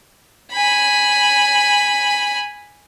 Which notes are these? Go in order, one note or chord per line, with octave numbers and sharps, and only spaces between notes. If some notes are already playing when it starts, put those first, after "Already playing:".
G#5 B5